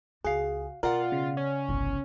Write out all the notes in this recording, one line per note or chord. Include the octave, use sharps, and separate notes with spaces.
C#2 F#4 G#4 F5
B2 F4 A#4 D5 F#5
C#3
C#4
G1 C2